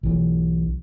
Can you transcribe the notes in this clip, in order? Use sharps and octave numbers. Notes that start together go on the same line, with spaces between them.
B1 E3